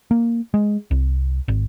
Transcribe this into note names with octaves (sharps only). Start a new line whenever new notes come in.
A#3
G#3
C2
G#1